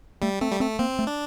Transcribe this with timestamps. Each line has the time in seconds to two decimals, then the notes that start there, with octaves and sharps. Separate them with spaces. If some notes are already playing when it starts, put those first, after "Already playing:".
0.22 G3 A3
0.41 A3 C4
0.52 G3
0.60 A3 C4
0.79 A#3 C4
0.99 A3
1.07 D4